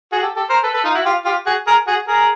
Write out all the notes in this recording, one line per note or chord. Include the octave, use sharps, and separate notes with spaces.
F#4 G#4
G4 A4
G4 A4
A#4 C5
A4 B4
A4 B4
D#4 F4
E4 F#4
F4 G4
F4 G4
F#4 G#4
G#4 A#4
F#4 G#4
G#4 A#4